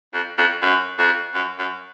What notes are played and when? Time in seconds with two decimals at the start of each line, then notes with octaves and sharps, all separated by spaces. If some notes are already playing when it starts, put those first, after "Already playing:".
0.14 F2
0.38 F2
0.62 F#2
0.99 F2
1.34 F#2
1.59 F#2